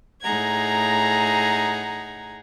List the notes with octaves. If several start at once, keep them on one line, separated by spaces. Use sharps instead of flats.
A2 D#4 G#4 F#5 A#5 G#6